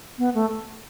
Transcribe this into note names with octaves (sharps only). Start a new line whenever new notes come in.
B3
A3